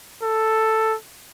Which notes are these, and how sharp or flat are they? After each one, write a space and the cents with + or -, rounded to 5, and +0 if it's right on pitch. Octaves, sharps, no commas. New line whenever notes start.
A4 +5